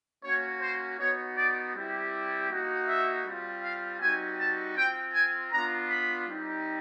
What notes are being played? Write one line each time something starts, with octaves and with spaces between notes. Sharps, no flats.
A#3 C#4 F#4 C#5
C5
B3 D#4 F#4 C#5
D5
G3 C4 E4 G4
A#3 D#4 F#4
E5
G3 C4 F4
F5
G3 C4 D#4 F#4 G#5
A5
C4 F4 G5
G#5
B3 D4 F4 A#5
B5
G3 C4 D#4 G4